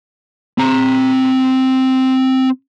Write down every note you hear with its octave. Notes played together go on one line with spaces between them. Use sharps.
C4 A#5